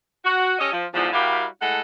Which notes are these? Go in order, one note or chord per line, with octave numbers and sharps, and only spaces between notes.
F#4
C#4 G4 A4 D#5
F3
E2 G#2 D3 F3
G3 E4 F#4 G4 A#4 F5
G#3 A3 E4 A4 F#5